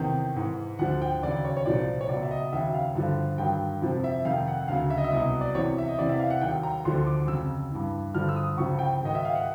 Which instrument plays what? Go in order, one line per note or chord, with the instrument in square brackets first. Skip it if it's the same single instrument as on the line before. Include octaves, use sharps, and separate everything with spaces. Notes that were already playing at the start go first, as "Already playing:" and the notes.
Already playing: [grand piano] E2 C3 D#3
G#2 E3
D2 D3 F3 F#5
G5
D#2 C#3 F#3 D5
C#5
C#5
C2 A#2 F3 D5
C#5
C#2 B2 F#3 D5
E5
D#5
D#2 C#3 F#3 E5
F5
G2 D3 F3
G2 D#3 F#3 G5
F2 C3 F3
E5
F2 C3 D#3 F5
F#5
D2 C#3 F#3 F5
E5
D#5
E5
C2 B2 F#3 D#5
D5
E2 C3 E3 C#5
E5
D#5
E2 C3 E3 D5
E5
F5
F#5
D#2 D#3 F#3 G5
A#5
D2 D3 F3 C6
D6
F2 C#3 F#3 E6
G2 E3
G2 D3 F3 F6
E6
D#6
C#2 C#3 F3 C#6
G5
G#2 D#3 F#3 D#5
E5
F5
F#5